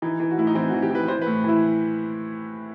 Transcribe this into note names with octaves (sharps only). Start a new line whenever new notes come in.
E3 D#4
E3
F#4
A2 E4
D#4
E3 C4
F#4
E3
G4
E3 B4
E3 C5
B4
A2
E3 E4